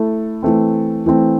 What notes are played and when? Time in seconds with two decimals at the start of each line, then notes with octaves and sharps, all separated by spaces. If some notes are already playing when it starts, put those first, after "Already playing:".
Already playing: A3 E4 A4
0.43 E3 A3 C4
1.06 E3 A3 C4